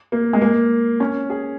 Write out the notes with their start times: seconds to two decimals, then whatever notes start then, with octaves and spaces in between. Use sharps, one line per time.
0.12 A#3
0.33 G#3
0.41 A#3
1.00 C#4
1.30 G#4